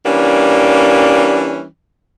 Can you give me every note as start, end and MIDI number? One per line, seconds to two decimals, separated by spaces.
0.06 1.64 52
0.06 1.64 55
0.06 1.64 58
0.06 1.64 61
0.06 1.64 62